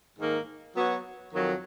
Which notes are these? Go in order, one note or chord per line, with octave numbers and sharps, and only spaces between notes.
G#2 D#3 A#3
F#3 B3 F#4 C#5
F2 D#3 F#3